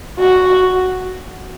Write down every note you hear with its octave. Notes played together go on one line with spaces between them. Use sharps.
F#4